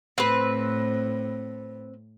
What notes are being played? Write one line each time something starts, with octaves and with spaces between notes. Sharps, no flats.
A2 C4 B4